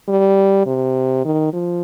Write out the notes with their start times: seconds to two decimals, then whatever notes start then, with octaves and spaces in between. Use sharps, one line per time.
0.09 G3
0.66 C3
1.25 D#3
1.53 F3